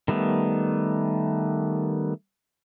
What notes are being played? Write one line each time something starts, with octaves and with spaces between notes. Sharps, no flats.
D#3 G3 A3 B3